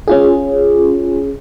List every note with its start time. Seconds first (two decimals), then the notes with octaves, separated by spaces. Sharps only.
0.08 C#4 F4 G#4